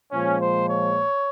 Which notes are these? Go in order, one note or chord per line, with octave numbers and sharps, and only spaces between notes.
A#2 F3 G#3 C#4
C5
C#5